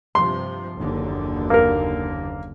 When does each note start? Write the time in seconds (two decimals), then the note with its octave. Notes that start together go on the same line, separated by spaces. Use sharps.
0.15 G2 C3 F3 C6
0.76 F#1 D#2 D3
1.50 A#3 A#4